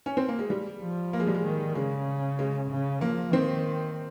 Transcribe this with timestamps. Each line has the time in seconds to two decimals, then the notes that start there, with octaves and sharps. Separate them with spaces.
0.06 C#4
0.17 C4
0.28 A#3
0.39 G#3
0.50 G3
0.82 F3
1.13 A#3
1.20 G#3
1.27 G3
1.34 G#3
1.44 D#3
1.75 C#3 G#3
2.39 G#3
2.70 C#3
3.01 F3 A#3
3.32 D#3 C4